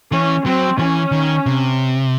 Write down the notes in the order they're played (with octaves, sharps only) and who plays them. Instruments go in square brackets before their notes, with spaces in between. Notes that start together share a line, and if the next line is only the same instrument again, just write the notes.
[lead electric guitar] E3 [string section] C#4
[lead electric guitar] F#3 [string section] C4
[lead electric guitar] E3 [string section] C#4
[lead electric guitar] D#3
C3